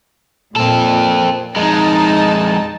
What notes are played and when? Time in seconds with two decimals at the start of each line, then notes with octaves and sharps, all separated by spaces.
0.56 A#2 C4 A4
1.56 F2 G#3 D#4 A5